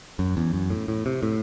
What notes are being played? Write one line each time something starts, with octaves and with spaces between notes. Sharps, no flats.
F#2
E2
F#2
A2
A2
C3
A2